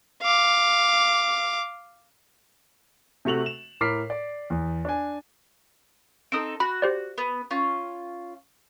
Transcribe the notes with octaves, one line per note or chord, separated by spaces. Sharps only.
F5 D6
C3 A3 F#4 F7 F#7
E7
A2 A#4 D6 F6 B6 C7
D5
E2
D4 G#5
C4 D#4 A4 D#6 D7
F#4 B5
G4 C5 D5
B3
C#4 F4